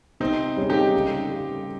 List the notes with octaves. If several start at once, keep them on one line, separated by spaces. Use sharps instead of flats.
C3 C4 D#4
G3 C#4 G#4
D#4 G4
C#3
G3